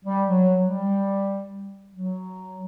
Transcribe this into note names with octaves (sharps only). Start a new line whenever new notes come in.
G3
F#3
G3
F#3